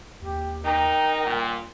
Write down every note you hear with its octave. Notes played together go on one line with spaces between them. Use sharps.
D#2 G4
D#4 A#4 G5
D#1 A#2